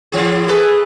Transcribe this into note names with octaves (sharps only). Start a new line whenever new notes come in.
A2 E3 G#4
A3 G#4 A4 B4